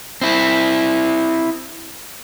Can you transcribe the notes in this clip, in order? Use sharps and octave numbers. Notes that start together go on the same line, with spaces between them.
C4 E4